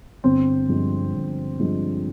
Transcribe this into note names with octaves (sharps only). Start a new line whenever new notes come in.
G1 C4
G2 F3 G#3
G1
G2 F3 G#3